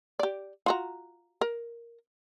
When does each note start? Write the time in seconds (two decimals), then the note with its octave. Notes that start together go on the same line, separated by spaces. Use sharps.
0.19 G4 D5
0.66 F4 F#4 A#5
1.41 A#4